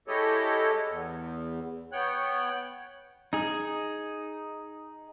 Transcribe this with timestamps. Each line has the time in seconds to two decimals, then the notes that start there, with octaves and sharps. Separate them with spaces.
0.08 G#3 E4 G4 A4 C#5 D#5
0.89 E2
1.92 B3 C#5 G5 F#6
3.33 D#4 G#4